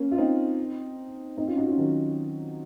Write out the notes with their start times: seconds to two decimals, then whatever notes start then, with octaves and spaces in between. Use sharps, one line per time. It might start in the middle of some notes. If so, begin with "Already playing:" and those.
Already playing: A#3 C#4
0.11 F4
0.18 C4 D#4
1.38 C4 D#4
1.48 C#4 F4
1.57 D#4 F#4
1.68 C#4 F4
1.78 D#3 F#3